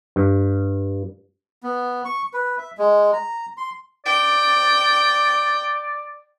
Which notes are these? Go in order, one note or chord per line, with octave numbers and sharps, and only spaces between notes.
G2
B3
C#6
B4
E5
G#3
A#5
C6
D5 G5